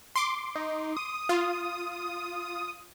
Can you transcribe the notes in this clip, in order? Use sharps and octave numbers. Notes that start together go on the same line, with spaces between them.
C6 D6
D#4
D#6
F4